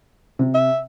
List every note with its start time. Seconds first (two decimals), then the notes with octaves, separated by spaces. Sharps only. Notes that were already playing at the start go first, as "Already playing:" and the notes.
0.39 C3
0.55 E5